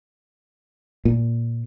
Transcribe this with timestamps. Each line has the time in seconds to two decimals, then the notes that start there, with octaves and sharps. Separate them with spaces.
1.05 A#2